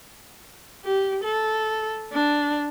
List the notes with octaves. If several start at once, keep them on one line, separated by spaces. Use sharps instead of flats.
G4
A4
D4